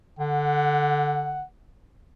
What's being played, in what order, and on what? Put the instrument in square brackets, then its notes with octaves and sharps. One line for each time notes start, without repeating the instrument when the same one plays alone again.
[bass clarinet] D3 [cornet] F#5